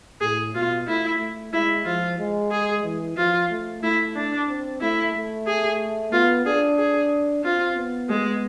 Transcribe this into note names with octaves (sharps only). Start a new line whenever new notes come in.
A2 G#4
B2 F4
A3 E4
A3
G#3 E4
F3 F4
G#3
G#4
E3
F3 F4
A3
A3 E4
D4
C4
A3 E4
A3
G#4
B3 F4
D4 G#4
G#4
C4 F4
B3
G#3